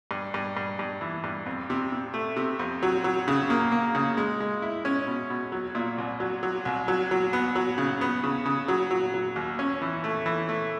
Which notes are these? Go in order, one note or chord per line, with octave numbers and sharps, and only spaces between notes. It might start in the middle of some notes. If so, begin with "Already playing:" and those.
G2
G2
G2
G2
E3
G2
F2
C3
C3
A3
C3
F2
F#3
F#3
C#3
A#3
A#3
C#3
G#3
G#3
E4
C#4
B2
B2
F#3
A#2
C2
F#3
F#3
C2
F#3
F#3
B3
F#3
C#3
B3
C#3
C#3
F#3
F#3
F#3
D#2
C#4
E3
A3
E3
A3